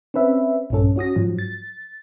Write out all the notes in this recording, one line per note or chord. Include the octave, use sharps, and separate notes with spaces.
C4 C#4 B4 E5
A#1 G2 C#4 A4
C#4 F#4 D#6 A#6
G#2 F3 F#3
A6